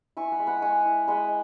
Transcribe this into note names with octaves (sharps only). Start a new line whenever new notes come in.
E4 G#5 C#6
F#5 B5
G#3
F#5 B5
G#3 G#5 C#6
E4
G#3 F#5 B5